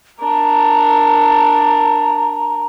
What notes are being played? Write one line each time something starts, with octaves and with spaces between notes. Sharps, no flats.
D4 A#4 A#5